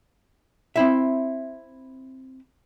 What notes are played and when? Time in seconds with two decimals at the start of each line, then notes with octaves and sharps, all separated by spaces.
0.76 C4 E4 E5